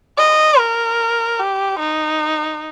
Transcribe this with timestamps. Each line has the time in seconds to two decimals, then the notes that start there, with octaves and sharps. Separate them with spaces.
0.18 D#5
0.59 A#4
1.40 G4
1.80 D#4